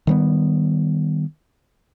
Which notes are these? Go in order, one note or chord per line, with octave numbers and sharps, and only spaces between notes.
D#3 G3 B3